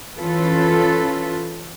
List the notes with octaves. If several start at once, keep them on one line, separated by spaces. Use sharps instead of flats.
E3 C#4 F4 A4 B4